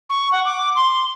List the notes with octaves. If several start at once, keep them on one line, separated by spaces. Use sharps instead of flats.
C#6
F#5
D6
C6